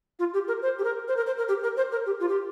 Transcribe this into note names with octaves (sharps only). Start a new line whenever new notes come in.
F4
G4
A#4
C5
G4
A#4
C5
A#4
C5
A#4
G4
A#4
C5
A#4
G4
F4
G4